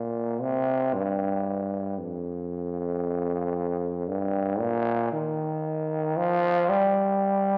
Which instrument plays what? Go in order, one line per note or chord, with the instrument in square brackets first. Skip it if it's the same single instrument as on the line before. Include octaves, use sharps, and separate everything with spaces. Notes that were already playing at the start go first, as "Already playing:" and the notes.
Already playing: [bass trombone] A#2
C3
G2
F2
G2
A#2
D#3
F3
G3